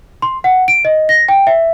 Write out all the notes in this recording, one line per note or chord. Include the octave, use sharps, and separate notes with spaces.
C6
F#5
D7
D#5
A#6
G5
E5